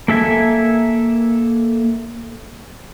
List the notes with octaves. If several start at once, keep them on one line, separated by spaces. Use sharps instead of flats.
A#3 A4 E5 G#5